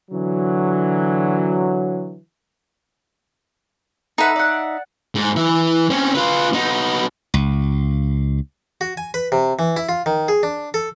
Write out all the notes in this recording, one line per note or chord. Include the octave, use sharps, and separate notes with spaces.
D3 E3 F#3
D#4 A4 B4 E5 F#5
D5 F#5
G#2
E3 E5
C4 C#4
F4 B4
B3 D#4
C#2
F#4
G#5
B4
C3
E3
E4
F4
D#3
G#4
D4
A4